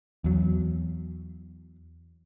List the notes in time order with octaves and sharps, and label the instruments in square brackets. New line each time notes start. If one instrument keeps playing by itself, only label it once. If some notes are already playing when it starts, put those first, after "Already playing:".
[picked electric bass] E2 F#3